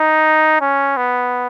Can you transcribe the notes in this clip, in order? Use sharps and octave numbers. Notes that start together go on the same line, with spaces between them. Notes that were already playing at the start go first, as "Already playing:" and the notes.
Already playing: D#4
C#4
B3